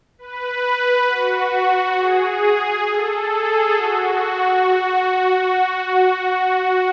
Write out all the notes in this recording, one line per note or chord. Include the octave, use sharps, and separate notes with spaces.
B4
F#4
G#4
A4
G#4
F#4